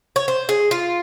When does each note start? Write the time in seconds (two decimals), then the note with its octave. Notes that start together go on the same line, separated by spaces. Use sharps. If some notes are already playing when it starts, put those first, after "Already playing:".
0.16 C#5
0.28 C5
0.49 G#4
0.71 F4